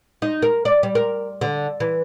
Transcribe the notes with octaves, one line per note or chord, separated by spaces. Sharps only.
D#4
A#4
D5
G3
A#4
D3
E3